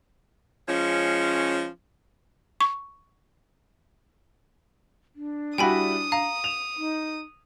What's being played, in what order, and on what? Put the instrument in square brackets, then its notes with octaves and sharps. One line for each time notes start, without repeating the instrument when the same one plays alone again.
[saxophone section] F3 G#3 C#4
[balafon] C#6
[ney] D4
[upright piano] G3 E4 F#4 [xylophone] G5 G#5 B5 [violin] D#6
[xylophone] F5 [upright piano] A#5
[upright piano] E7 F7
[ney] D#4